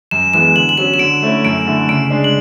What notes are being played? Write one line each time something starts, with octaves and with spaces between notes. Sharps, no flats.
F#2 E7
E3 G#3 B3 E7
D3 F#7
F#7
F#3 C#4 E7
E7
D3 D7
A3 C#4 E4
F#2 D7
D3 A3 E4
C#3 D7
G#3 D4
F#7